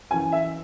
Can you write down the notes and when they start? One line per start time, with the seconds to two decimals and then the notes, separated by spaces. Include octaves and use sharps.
0.11 F#2 G#5
0.13 E3
0.32 E5